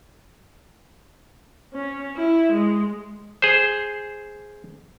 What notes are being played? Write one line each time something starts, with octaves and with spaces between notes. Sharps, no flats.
C#4
E4
G#3
G#4 C5